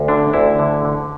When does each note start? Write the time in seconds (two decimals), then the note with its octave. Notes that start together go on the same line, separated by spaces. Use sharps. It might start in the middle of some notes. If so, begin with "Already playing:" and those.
Already playing: D2
0.08 D3 D4
0.33 D2 E4
0.59 D3
0.85 D3